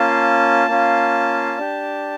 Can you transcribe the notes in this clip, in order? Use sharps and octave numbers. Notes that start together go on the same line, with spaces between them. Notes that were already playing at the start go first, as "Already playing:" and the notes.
Already playing: A#3 C#4 F4 A5
A#3 C#4 F4
D4 G4